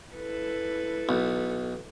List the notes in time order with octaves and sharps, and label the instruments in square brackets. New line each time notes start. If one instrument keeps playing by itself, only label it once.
[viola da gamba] E4 A4 B4
[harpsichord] B1